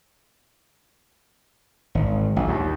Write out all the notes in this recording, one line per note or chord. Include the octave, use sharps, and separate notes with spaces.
G#1
A#1
D#2